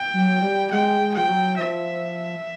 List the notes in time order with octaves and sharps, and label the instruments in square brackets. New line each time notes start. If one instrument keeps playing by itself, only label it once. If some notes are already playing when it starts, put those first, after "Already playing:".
Already playing: [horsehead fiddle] G5
[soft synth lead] F#3
G3
[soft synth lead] G#3 [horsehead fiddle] G5
[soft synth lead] G#3
[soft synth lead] F3 [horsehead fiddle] G5
[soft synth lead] F#3
[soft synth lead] F3 [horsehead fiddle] E5